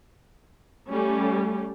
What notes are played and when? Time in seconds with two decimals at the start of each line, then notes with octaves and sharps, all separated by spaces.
0.90 G3 A3 C#4